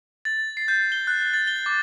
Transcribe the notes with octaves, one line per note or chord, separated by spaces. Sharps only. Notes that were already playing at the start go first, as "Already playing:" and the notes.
A6
C7
G6
G7
F#6
A6
G7
D6